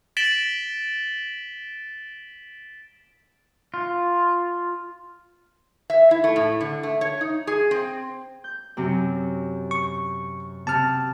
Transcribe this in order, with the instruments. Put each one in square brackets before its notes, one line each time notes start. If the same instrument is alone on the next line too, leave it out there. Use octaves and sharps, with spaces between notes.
[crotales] A6 B6 D7 E7 F#7 G7
[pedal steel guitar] F4
[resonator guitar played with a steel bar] E5
E4
A3
A2
D3
A3
C#5
D#4
G#4
C4
[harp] G6
F#2 C3
[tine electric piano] C#6
[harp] C3 [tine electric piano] A5 F6